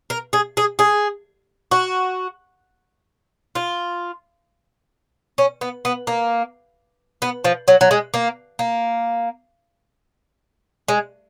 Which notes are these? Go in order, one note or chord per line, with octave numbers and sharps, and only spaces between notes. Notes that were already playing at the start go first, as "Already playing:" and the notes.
A#4
G#4
G#4
G#4
F#4
F4
C#4
B3
B3
A#3
B3
F3
F#3
F#3
G#3
A#3
A#3
G#3